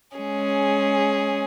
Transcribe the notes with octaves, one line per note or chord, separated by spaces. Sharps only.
G#3 C#4 G#4